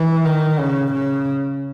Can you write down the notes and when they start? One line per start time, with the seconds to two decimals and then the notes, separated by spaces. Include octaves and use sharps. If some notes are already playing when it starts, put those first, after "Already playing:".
Already playing: E3
0.25 D#3
0.59 C#3
0.93 C#3